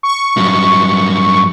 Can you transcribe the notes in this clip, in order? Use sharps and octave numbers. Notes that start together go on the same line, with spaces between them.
C#6
G2 F#3